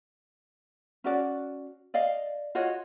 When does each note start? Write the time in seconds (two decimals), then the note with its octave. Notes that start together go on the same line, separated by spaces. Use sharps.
1.04 C#4 F#4 D5
1.94 D5 D#5 F5
2.55 F4 F#4 C#5 D#5